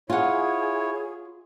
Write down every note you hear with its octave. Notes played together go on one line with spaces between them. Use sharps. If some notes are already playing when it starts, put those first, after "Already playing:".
E4 F4 G#4 C#5 F#5 G#5